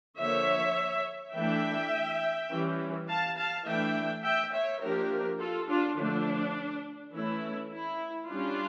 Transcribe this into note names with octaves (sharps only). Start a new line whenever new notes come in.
D3 F3 A#3 C#5 E5
E3 A3 D4 E5 G5
E3 G3 C#4
F5 A5
F5 A5
E3 A3 D4 E5 G5
E5 G5
C#5 E5
F3 A#3 D4 G4 A#4
F4 A4
D4 F4
D3 F3 A3 D4
E3 A3 C#4 E4
E4
G3 C#4 D4 F4